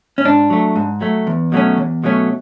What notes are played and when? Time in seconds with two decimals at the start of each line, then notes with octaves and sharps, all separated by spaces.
0.18 C#4
0.24 G#2 D4
0.50 F#3 A3
0.76 G#2
1.01 F#3 A3
1.27 E2
1.52 B2 F#3 A3 C#4
1.77 E2
2.04 B2 F#3 A3 C#4